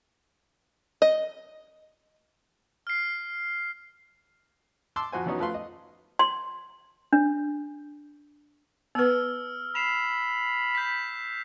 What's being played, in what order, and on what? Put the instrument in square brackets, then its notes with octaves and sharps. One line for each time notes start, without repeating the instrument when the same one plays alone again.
[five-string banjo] D#5
[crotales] F6 C7
[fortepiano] A5 C6 D6 E6
F2 F#4 C5 G#5
E3 F#3 B3 C#4 D#4
F3 A3 B4 F5 C6
D#5
[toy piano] C6
D4
[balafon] B3 B4 [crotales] E6 F6
[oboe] B5 [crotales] C7 E7 F7
[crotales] G6 B6